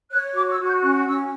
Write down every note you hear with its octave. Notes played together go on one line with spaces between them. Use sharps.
C#5 F#6
F#4 D6
E6
F#4
G6
C#4 F#6
C#4 E6